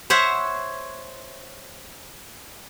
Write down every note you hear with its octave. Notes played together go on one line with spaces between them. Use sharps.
C5 C#5 E5 F#5